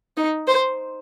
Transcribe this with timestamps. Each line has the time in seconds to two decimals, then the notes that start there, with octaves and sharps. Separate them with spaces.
0.17 D#4
0.48 C5